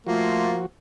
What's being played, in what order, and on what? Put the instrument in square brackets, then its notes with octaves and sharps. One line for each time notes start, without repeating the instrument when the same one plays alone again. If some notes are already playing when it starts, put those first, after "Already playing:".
[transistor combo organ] F3 F#4 [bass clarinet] A3 [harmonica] A#3 [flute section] F4